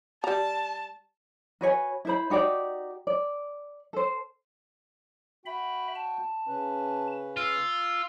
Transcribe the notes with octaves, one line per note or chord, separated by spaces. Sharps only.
G3 A5 A#5
F#4 B4 C#5 G#5
E4 C5 B5
D#4 F#4 G4 D5
D5
A4 C5
F#4 E5 G5 B5
A5
C#3 C#4 B4
F4 E6